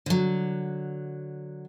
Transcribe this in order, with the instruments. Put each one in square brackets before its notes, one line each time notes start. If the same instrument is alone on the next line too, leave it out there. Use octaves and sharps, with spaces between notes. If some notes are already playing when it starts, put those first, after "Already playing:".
[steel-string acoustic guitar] D3 F#3